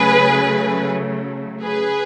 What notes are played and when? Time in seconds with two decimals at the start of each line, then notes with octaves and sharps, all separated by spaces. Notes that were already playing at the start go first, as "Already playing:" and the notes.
Already playing: C#3 F#3 A3 G#4 B4
1.64 G#4 B4